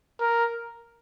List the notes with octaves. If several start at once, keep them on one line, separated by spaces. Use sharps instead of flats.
A#4